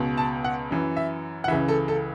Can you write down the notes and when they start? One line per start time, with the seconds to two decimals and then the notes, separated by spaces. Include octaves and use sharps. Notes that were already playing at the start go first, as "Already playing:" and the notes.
Already playing: C#2 B2
0.18 A5
0.44 F#5
0.71 F#2 E3
0.96 E5
1.44 F#5
1.48 C#2 C#3 E3 E5
1.68 A4
1.88 A4